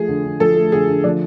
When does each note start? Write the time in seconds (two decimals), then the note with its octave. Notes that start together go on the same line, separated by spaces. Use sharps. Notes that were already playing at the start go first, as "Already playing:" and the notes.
Already playing: F3 A3 G#4
0.08 D3
0.25 D3
0.40 F3 A4
0.56 A3
0.72 D3 G#4
0.88 D3
1.04 F3 D4